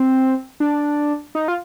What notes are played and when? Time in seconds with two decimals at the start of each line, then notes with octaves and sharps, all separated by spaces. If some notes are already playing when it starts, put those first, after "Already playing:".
Already playing: C4
0.60 D4
1.35 D#4
1.48 F4